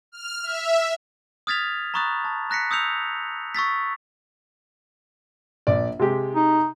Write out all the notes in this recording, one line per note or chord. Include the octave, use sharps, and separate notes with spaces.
F6
E5
D#6 F6 G#6 A6 B6 F7
A#5 B5 C#6 D#6 F#6 A6
A5
A#5 F#6 A#6 B6 C#7
D#6 E6 G6 C#7 F7
C#6 E6 A6 B6
A#1 D5
C3 G#3 G4
D#4